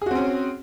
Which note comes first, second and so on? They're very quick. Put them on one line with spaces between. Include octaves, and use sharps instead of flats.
G#4 F#4 C4 C#4